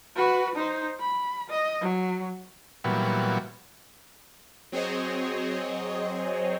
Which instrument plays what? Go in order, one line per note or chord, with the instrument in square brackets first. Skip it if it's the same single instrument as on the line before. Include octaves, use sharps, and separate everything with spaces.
[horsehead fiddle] F#4 B4
D#4 C5
B5
D#5
F#3
[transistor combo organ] A#2 E3 F#3 G3 B3
[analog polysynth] F#3 C4 G#4 C5 C#5 D#5